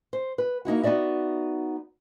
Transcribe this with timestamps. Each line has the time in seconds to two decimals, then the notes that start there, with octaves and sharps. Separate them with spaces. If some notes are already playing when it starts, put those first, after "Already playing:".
0.13 C5
0.38 B4
0.65 A#3 D#4 E4 F#4
0.83 B3 D#4 F#4 D5 E5